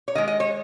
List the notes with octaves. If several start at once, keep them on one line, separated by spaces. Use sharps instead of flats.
C#5
D#3 G#3 D#5
D#5
C#5